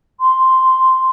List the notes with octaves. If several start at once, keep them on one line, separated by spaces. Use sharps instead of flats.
C6